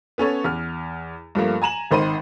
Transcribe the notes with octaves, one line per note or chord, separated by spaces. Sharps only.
B3 C#4 A4 C#5
E2 F6
G2 F3 A3 A#3
G#5 A#5 E7 F#7
G#1 D#3 C5 B5 C6 D#7